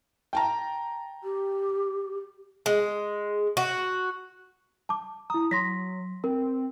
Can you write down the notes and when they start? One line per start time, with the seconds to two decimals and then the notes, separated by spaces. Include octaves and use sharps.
0.33 G5 A5 A#5
1.24 G4
2.66 G#3
3.57 F#4
4.89 A5 D6
5.30 E4 A#5 D#6
5.51 F#3 C6 A#6 B6
6.24 C4 A#4